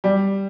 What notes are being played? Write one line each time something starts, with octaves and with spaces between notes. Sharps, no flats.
G3